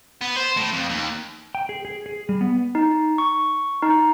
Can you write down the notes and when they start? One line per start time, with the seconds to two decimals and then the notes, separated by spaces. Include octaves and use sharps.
0.22 B3
0.37 C5
0.57 A2
0.73 F2
0.90 D#2
1.55 G5
1.69 G#4
1.85 G#4
2.06 G#4
2.29 G3
2.41 B3
2.75 D#4
3.18 C#6
3.82 D#4